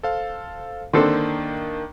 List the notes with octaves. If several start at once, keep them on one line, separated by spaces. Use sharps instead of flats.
A4 C5 F5
D3 D#3 A#3 C4 D4 A4